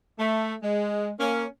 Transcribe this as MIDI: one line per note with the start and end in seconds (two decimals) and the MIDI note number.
0.19 0.54 57
0.63 1.10 56
1.20 1.45 58
1.20 1.45 61